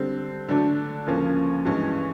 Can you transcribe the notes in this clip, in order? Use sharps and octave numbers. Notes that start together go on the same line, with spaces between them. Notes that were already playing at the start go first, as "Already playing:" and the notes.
Already playing: D3 G3 C4
D3 F#3 A3 D4
D2 C#3 F3 A#3 C#4
G2 E3 G#3 C#4